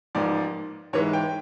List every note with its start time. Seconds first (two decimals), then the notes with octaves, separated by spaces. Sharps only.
0.15 A1 G#2 F3 A#3 D5
0.93 G#2 E3 G#3 C#5
1.13 G5